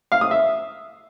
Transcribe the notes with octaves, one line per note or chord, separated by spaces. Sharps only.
F5
D#6
E5